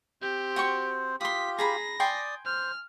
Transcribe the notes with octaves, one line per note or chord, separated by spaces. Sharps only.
C4 G4 C5
F#4 G5 C#6
F4 G4 C6 D#6 B6
G#4 A#5 B5 A#6
D5 G5 G#5 C6 D#6
C5 F6